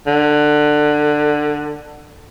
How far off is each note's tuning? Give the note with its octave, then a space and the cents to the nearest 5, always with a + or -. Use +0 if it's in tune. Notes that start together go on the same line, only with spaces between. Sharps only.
D3 +20